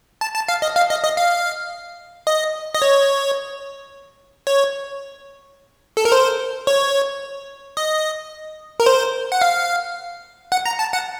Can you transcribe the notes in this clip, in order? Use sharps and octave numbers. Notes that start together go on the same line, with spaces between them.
A5
A5
F5
D#5
F5
D#5
D#5
F5
D#5
D#5
C#5
C#5
A4
A#4
C5
C#5
D#5
A#4
C5
F#5
F5
F#5
A#5
A5
F#5